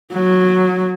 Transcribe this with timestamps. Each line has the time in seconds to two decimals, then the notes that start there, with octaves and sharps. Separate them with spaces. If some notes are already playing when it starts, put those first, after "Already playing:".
0.14 F#3